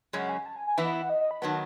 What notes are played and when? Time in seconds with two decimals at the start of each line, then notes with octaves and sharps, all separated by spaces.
0.13 F#2 C#3 G#3 C#4 F#5
0.29 G#5
0.46 A5
0.56 G#5
0.67 G#5
0.78 E3 B3 E4 E5
0.85 D#5
0.94 E5
1.02 F#5
1.10 D#5
1.21 D#5
1.31 B5
1.42 D#3 F#3 B3 A5